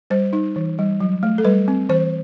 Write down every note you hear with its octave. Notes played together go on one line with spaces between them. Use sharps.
G3 C5
D#4
E3
G3
F#3
A3
A4
G3 B4
C4
E3 C5